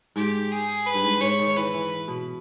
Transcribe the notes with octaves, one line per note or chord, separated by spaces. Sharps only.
G#2 G4
G#4
B4
G2
G#2
G#2 C#5
D#3
E3 B4
E3
B2